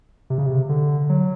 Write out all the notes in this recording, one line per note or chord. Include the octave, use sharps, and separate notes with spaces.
C3
C#3
C3
D3
F#3